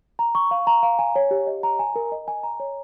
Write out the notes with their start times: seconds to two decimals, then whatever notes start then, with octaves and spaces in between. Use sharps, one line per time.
0.19 A#5
0.35 C#6
0.51 F5
0.67 A#5
0.83 F5
0.99 G#5
1.16 C#5
1.31 G4
1.47 D#5
1.63 A#5
1.79 G#5
1.96 A#4
2.12 D#5
2.28 G#5
2.43 A#5
2.60 C#5